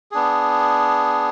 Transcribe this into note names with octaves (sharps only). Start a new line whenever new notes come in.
B3 D4 G#4